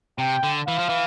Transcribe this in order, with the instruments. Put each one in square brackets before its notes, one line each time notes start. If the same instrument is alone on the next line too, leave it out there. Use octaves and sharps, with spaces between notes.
[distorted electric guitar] C3 [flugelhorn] G5
[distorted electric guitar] D3
[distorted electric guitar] E3 [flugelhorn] F5
[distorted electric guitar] F3
E3